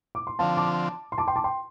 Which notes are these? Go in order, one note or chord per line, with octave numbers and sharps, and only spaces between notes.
D6
C6
D3 F3 C4 F5 A5
A5 D6
C6
A5 D6
G5 C6
A5 D6
G5 C6